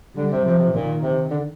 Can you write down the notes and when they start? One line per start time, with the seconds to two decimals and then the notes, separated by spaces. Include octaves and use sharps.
0.16 D3 G3
0.31 C3
0.45 C3 F3
0.59 C3
0.73 A#2 D#3
1.02 C3
1.30 D3